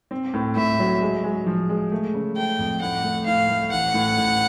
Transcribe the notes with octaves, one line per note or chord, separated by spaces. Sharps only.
C4
A2
A2 E5
F#3
G#3
G#3
F3
G#3
A3
C#3
A3 G5
F2
A2 F#5
A3
A2 F5
A3
A1 F#5
A2
A2